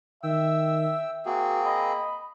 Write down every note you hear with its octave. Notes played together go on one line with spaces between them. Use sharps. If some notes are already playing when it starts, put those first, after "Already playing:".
D#3 E5 G5 E6
A#3 C4 F#4 G#4
D#5 B5